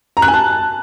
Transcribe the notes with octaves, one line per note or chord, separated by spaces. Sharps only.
A#5
F#6
G#5
A5